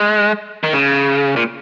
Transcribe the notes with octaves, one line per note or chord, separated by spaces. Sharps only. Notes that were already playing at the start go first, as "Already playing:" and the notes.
Already playing: G#3
D#3
C#3
A#2